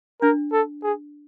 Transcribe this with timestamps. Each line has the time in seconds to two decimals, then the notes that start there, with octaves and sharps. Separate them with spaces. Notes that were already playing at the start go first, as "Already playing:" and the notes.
0.22 D4 A#4
0.53 A4
0.83 G#4